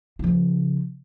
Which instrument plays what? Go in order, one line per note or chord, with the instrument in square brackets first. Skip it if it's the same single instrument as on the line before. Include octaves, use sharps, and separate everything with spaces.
[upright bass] C#3 F3